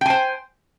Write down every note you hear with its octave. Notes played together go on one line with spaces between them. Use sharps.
C5 G5 G#5